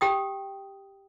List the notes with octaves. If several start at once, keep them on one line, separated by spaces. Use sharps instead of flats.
G4 G5 D#6